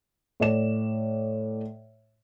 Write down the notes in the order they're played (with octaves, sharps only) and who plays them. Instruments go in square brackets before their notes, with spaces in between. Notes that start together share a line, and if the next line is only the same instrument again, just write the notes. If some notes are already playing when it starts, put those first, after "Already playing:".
[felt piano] A2 D5 E7